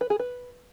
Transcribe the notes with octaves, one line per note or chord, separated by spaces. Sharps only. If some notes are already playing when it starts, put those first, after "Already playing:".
B4
G#4
B4